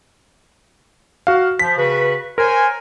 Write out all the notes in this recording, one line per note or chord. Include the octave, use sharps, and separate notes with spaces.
F#4 F5
F3 B6
C#3 F#4 B4
A#4 C5 C#5 G#5